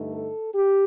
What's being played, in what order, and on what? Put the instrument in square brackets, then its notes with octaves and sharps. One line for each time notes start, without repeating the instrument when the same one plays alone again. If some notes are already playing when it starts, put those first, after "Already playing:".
Already playing: [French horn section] G2 D3 A3 D#4
A4
G4